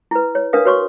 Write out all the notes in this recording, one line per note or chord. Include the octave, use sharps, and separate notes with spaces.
E4 B4
C#5
D4 A#4 B4 F5 D#6
F#4 B4 C#5 C6 C#6